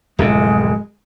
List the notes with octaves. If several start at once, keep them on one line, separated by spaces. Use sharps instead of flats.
D1 F2 C3 G#3